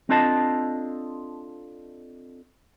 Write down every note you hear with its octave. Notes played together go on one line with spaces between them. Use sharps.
C4 D4 F4 A4 D#5 A5